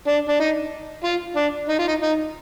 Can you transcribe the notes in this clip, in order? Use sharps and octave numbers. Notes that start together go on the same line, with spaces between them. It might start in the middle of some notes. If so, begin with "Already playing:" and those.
D4
D4
D#4
F4
D4
D#4
F4
D#4
D#4